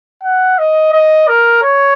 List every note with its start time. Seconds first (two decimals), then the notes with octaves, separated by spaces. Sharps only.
0.23 F#5
0.59 D#5
0.93 D#5
1.28 A#4
1.63 C#5